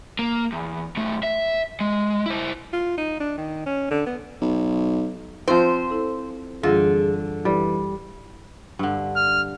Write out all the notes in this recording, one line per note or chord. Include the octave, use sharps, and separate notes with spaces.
A#3
E2
B1 A3
E5
G#3
E4 C5
F4
D#4
D4
D#3
C#4
D3
B3
B1
F3 C4 C5 G5
E4 A4
F#2 D3 E3 G3 F4 G#4
E3 G3
G2 D3
F6